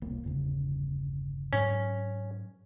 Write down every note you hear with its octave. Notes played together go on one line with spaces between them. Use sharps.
E1 C2 A#3
G1 E2 C#3
G#2 F#3 C#4